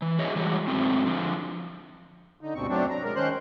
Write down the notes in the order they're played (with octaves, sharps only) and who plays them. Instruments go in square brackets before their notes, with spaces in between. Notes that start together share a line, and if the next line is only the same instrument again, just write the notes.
[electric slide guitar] E3
F#4 G#4 C#5 D#5 E5
E3 G3 G#3 F#4
G#2 D#3 F#3 A3 C4
D3 F3
[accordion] D3 D#4
D2 G2 B2 C4 C#6
F#3 A3 C4 D4
A#5
G#3 A#4
D#3 C#4 C5 C6 F#6